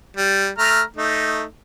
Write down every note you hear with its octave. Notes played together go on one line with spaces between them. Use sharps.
G3
A3 A#5 F6
A3 D#4